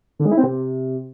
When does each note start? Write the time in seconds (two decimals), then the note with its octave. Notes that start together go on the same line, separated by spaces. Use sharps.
0.19 D3
0.25 G#3
0.31 E4
0.37 C4
0.43 C3